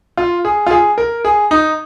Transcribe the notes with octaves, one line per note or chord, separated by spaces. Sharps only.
F4
G#4
F4
G#4
A#4
G#4
D#4